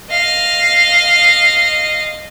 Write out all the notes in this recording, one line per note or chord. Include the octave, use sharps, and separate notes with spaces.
D#5 F5